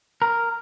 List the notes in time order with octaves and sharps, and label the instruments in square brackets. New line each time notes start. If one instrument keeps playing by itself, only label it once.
[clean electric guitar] A#4